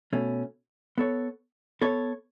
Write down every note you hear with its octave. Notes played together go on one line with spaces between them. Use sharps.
B2 A3 C#4
B3 A4 C#5
B3 A4 C#5